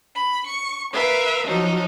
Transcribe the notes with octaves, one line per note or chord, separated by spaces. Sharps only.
B5
C#6
A#4 B4 E5 F5
F3 F#3 D#4